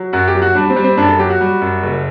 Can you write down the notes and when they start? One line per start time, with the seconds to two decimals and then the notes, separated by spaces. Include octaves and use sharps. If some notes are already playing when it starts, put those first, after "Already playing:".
Already playing: F#3
0.13 F#2 F#4
0.28 G4
0.35 F#3
0.42 F#4
0.55 G3 D4
0.70 C4
0.76 G3
0.84 C4
0.97 F#2 D4
1.08 A4
1.19 F#3 G4
1.30 F#4
1.41 G3
1.62 F#2
1.83 F#1